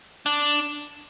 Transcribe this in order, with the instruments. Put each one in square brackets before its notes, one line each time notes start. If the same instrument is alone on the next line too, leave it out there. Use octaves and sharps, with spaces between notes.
[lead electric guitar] D4